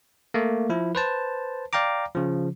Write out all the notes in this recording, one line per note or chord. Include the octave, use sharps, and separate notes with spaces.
A3 A#3
F3 E4
B4 C5 A5
D5 F5 G5 A#5 D6
C#3 F3